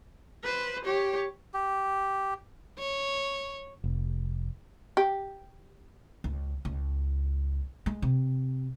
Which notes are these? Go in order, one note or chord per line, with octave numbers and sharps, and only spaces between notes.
B4 C5
G4 C#5
G4
C#5
F1
G4
C#2
C#2
G#3
C3